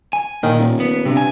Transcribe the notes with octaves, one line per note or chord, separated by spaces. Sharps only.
G#5
A#2 D#3
D#1
B3
G2 C3
G#5